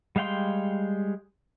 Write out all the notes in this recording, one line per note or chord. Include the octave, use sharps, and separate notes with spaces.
G3 G#3 F5 G5 C6